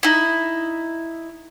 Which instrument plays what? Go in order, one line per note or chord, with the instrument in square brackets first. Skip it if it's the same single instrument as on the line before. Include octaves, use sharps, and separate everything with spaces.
[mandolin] D#4 E4